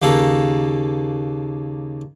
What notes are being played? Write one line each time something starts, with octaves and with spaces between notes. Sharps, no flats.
D#2 C#3 A#3 A4